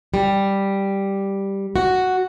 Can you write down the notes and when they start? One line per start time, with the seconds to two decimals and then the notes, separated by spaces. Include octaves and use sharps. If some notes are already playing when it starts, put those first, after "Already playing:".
0.14 G3
1.76 F#4